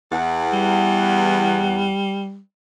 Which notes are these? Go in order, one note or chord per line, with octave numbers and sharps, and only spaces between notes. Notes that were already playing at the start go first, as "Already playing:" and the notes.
E2 F#5
G3